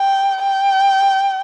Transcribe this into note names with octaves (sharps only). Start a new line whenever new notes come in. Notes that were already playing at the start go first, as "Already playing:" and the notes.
Already playing: G5
G5